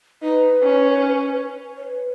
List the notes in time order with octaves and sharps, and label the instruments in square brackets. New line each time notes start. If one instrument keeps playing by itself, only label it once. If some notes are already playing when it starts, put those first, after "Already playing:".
[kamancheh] D#4 [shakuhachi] B4
[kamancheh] C#4
[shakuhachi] C#5
B4